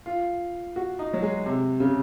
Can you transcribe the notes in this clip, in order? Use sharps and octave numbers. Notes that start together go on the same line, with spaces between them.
F4
F#4
D#4
F#3
G#3
C3
C#3